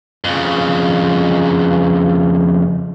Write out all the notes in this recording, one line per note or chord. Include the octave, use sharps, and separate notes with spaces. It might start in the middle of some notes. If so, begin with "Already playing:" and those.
F2 C#3